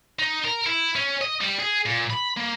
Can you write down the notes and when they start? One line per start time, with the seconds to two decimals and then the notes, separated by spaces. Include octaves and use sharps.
0.19 D#4
0.45 A#4
0.66 E4
0.95 C#4
1.21 D#5
1.41 G3
1.59 G#4
1.86 A#2
2.10 B5
2.37 A#3